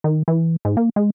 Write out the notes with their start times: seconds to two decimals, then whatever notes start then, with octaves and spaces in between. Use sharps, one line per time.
0.04 D#3
0.28 E3
0.65 G#2
0.77 A#3
0.96 G#3